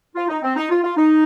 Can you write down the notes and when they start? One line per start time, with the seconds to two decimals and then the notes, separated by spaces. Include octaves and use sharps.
0.15 F4
0.28 D#4
0.42 C4
0.56 D#4
0.70 F4
0.83 F4
0.97 D#4